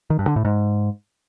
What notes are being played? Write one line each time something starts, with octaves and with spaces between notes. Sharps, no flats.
D#3
G2
D3
A2
G#2